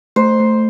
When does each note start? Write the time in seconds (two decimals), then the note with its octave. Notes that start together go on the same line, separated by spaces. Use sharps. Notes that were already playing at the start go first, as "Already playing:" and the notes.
0.16 A3 C5
0.40 A3